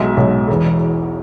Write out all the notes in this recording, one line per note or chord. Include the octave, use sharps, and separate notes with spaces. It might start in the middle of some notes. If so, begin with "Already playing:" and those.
Already playing: B1 B2 G#3 E5
B1 B2 G#3
E1 E2 E3